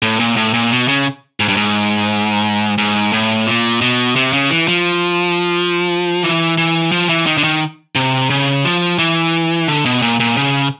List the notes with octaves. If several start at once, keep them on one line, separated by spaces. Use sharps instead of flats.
A2
A#2
A2
A#2
B2
C#3
G#2
G2
G#2
G#2
A2
A#2
B2
C3
C#3
E3
F3
E3
E3
F3
E3
D#3
D3
D#3
C3
C#3
F3
E3
D3
B2
A#2
A#2
C#3